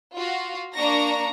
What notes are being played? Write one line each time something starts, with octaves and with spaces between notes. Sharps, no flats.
F4 F#4
A#3 D4 A#5 C#6 A#6